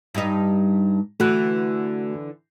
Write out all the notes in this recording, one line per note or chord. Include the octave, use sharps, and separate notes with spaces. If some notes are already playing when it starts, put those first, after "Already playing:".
G2 D#4
D3 E3 A3 F#4 F#6